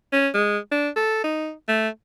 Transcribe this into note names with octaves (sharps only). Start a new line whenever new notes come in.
C#4
G#3
D4
A4
D#4
A3